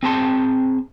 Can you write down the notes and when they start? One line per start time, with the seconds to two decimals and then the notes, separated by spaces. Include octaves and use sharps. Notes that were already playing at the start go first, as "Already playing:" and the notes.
0.03 C4 G#4 A5 C6